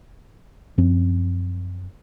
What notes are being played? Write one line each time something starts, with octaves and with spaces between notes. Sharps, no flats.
F#2 F3 C4